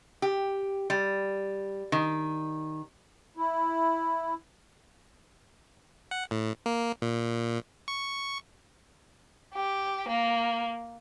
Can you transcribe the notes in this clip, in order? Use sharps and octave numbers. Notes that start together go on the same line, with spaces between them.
G4
G3
D#3
E4
F#5
A2
A#3
A#2
C#6
G4
A#3